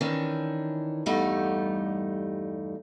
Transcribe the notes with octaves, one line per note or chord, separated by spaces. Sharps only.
D#3 E3 C#4 D4
E2 G2 G3 A3 D#4 F#5